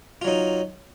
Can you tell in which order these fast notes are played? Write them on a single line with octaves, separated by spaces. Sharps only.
F4 F#3 D#4